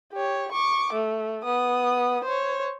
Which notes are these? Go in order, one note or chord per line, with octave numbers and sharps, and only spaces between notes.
G4 C#5
C#6 D6
A3
B3 D#6
C5 C#5